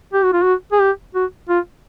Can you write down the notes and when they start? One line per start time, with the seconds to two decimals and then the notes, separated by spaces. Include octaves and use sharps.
0.13 G4
0.24 F#4
0.33 F4
0.42 F#4
0.72 G#4
0.81 G4
1.15 F#4
1.49 F4